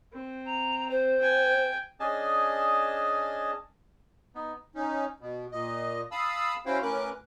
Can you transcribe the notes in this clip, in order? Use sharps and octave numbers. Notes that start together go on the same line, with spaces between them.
C4
A#5
C5
G5 G#5
C#4 D4 G#4 D#5 G#5 A5
B3 D#4
C#4 D#4
B2
A#2 D#5
F5 A5 B5 D#6 E6
C#4 E4 F#4 C5 F5 G5
A2 C#4 A#4 B4 D6 F#6